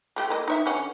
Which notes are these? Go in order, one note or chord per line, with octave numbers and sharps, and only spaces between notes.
G#3 A3 G4
A#3 A4 D#5
D#4 C#5 E5
D3 C#4 F#5